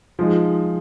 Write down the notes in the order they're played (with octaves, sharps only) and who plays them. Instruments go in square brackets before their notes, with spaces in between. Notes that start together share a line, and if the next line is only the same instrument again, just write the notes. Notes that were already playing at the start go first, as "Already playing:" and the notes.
[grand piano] F3 G#3 D#4